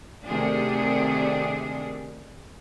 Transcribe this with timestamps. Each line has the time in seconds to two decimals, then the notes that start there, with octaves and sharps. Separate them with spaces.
0.24 C3 D#3 A3 D4 G#4